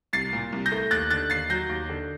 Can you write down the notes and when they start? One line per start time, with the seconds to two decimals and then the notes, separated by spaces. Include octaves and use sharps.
0.13 C2 A6 C7
0.33 A#2
0.52 C2
0.66 G6 A#6
0.72 A3
0.91 D#2 F#6 A6
1.10 D3 F#6 A6
1.30 D#2 A6 C7
1.50 F#3 G6 A#6
1.69 D#2
1.90 D3